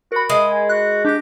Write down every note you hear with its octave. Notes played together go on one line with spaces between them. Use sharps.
F#4 A#4 B5
G#3 D#6
G#5
F#4 F#6
D4 G4 A#6